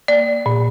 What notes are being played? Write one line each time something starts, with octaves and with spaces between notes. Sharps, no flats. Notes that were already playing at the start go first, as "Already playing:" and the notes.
A#3 D5
A#2